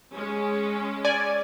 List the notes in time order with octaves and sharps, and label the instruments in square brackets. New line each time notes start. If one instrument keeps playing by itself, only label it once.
[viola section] G#3 C#4
[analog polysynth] D5 G#5